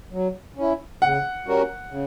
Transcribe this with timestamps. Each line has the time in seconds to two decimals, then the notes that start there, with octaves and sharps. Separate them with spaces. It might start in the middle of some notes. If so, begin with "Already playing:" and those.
0.12 F#3
0.57 C#4 E4
1.02 C#3 F#5
1.46 G3 C#4 F#4 A#4
1.91 C#3